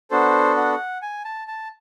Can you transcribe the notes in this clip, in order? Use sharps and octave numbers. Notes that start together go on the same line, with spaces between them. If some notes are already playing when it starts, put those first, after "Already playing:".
B3 D4 F#4 A4 C5
F#5
G#5
A5
A5